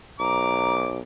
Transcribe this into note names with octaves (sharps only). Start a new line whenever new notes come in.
B1 A#5 D6